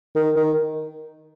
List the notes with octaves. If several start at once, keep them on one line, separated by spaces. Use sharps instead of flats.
D#3
D#3